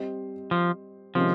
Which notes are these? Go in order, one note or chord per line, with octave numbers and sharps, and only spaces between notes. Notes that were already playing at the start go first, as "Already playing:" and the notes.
Already playing: G3 C4 G4 C5 D#5
F3
C3 D#3 F3 G#3 C#4